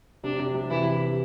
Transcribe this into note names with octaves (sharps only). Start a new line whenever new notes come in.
C3 D4
C3
C3
C3 E3 E4